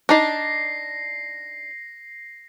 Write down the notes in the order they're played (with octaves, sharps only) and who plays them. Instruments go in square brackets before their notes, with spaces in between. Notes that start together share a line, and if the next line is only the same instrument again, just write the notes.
[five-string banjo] D4 D#4 D5 [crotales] A#6 C7